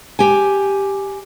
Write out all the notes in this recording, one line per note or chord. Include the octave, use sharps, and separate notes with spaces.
G4 G5 G#5